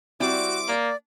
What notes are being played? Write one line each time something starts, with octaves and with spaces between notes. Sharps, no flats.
G3 C4 E4 F#4 D6
A#3 D5